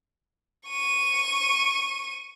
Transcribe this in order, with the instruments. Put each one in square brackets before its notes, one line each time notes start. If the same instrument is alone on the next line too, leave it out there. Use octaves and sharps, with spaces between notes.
[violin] C#6 D#7